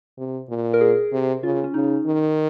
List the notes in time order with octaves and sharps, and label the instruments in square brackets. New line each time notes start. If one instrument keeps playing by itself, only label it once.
[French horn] C3
A#2
[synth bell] A#4
G#4
[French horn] C3
[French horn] C#3 [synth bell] F4
[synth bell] C#4
[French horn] C#3 [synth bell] D#4
[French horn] D#3